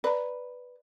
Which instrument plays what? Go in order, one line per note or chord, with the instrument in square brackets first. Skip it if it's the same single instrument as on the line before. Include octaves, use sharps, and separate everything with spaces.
[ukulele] B4 [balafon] D5 A#5